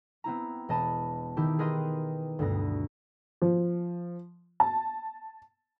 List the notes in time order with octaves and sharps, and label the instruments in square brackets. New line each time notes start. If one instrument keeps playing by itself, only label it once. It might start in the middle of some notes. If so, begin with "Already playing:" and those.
[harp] B3 C4 E4 A#5
E1 D#5 A5 B5
D#3 D#4 E4 G4
G#4 A#4 B4 D#5 G5 C6
D2 G2 B2 B3 A#6
[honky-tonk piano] F3
A5